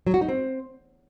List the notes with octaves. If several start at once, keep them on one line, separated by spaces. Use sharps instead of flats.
F#3
F#4
D#4
C4